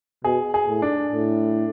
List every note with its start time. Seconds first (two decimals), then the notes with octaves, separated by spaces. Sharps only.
0.24 B2 G#4
0.54 G#4
0.68 A2
0.82 D4
1.12 A2